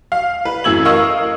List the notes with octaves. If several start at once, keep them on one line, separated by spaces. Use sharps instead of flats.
F5
B4
F#2 E3 A3 E6 G#6 F#7
A#4 D#5 F5 C#6 D#6 E6